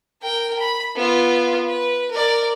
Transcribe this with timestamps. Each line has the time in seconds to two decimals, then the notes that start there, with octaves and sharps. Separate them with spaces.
0.22 A#4 G5
0.59 B5
0.96 B3 F4
1.67 B4
2.11 A#4 D5